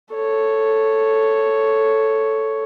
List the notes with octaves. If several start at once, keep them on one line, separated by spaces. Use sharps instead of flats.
A4 C#5